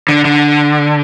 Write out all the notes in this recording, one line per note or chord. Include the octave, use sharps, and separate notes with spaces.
D3
D3